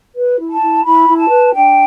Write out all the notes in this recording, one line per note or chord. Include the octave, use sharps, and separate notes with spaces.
B4
E4
A5
E4
E4 B5
E4
A5
B4
D4 G5